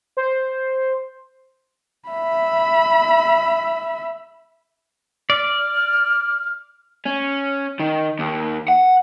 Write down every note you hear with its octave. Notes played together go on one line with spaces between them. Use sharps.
C5
E5 B5
D5 F6
C#4
D#3
D#2
F#5